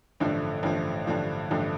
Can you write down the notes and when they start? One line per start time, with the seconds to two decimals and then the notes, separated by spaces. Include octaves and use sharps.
0.20 A1 G2 D3 F3 A3
0.63 A1 G2 D3 F3 A3
1.06 A1 G2 D3 F3 A3
1.51 A1 G2 D3 F3 A3